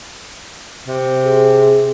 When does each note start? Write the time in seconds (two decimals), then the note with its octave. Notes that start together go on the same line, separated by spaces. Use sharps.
0.87 C3
1.25 G#4